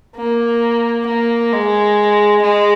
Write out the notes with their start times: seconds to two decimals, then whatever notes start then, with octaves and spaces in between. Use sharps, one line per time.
0.16 A#3
1.06 A#3
1.52 G#3
2.42 G#3